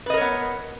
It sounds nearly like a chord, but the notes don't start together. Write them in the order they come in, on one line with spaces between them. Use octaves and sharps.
B4 D#5 A#4 C#5 B3